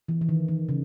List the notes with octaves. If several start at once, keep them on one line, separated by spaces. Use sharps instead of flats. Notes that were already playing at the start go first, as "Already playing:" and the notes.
E3
E3
D#3
D#3
C#3